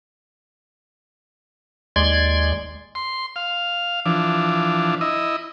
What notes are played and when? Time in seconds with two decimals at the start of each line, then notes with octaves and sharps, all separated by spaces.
1.96 D#2 G#3 D5 C6 G#6
2.95 C6
3.36 F5
4.05 E3 F3 D4
5.01 E4 D#5